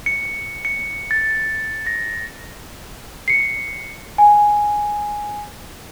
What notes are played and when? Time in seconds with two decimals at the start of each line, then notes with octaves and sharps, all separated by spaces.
0.06 C#7
0.65 C#7
1.11 A6
1.87 A#6
3.28 C7 C#7
4.18 G#5